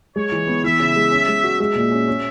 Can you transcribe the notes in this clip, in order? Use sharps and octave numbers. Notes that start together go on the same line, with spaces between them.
G#3 C#5
E3
B3
E3 E5
C#3
G#3
C#4
G#3
F#4
G#3 E5
A#2
C#4
C#4